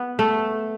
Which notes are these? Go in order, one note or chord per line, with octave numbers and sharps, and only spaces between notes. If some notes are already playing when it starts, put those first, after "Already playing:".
Already playing: B3
A3